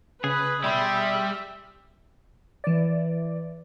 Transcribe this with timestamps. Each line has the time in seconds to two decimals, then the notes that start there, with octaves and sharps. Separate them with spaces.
0.24 C#3 G#4 B4
0.64 B2 G3 E5 B5 C6
2.64 E3 D5